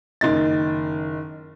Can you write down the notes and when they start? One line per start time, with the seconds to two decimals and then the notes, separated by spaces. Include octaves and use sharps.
0.21 F#1 D#3 D#4 A6